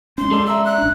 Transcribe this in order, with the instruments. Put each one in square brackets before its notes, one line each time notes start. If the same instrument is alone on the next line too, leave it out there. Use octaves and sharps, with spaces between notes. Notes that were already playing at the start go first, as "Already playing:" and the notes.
[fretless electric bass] G#3 C#4 [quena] C6
[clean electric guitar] G#4 A4 D5
[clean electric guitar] D5 E5 A#5 [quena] E6
[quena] F#6
[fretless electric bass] A1 D4